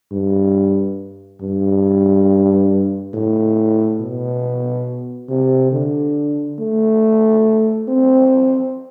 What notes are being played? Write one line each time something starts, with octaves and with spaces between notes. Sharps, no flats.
G2
G2
A2
B2
C3
D3
A3
C4